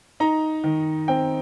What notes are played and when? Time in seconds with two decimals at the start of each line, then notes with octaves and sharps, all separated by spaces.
0.20 D#4 A#5
0.64 D#3
1.08 C4 G5